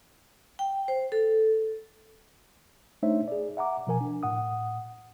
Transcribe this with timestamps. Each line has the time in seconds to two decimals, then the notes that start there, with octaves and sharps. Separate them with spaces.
0.59 G5
0.88 C5
1.12 A4
3.03 A3 D4 D#4 C5 C#5 E5
3.28 G#4 D5
3.57 E5 F#5 A#5 D6
3.87 B2 F3 A#4 G#5
4.01 D4
4.23 A2 F#5 D#6